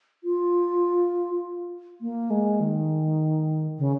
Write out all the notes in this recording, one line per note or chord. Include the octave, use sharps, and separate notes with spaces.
F4
A#3
G#3
D#3
C#3